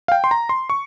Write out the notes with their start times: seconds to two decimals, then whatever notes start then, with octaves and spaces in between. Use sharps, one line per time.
0.08 F5
0.12 G5
0.24 C6
0.31 A#5
0.49 C6
0.70 C#6